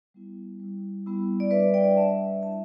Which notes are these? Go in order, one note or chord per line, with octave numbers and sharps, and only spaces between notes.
G3 B3 E4
G3 E4
G3 B3 E4
D5
G3 D4 B4 E5
D5 G5
G3 D4 E5 A5
G3 E4 E5 A5